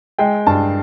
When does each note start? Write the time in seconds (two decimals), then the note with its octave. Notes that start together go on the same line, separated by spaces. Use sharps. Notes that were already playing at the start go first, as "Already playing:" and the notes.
0.18 G#3 G5
0.46 G2 A5